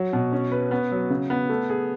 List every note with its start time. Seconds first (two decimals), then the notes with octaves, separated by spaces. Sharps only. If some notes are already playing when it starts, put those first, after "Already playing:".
Already playing: F#3
0.13 B2
0.32 C#4
0.52 B4
0.71 B3
0.91 F#3
1.10 C#3
1.30 B3
1.49 A3
1.70 G#4